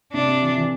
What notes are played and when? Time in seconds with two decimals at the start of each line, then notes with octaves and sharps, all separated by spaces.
0.13 C3 D4
0.27 C3
0.42 E3
0.56 E3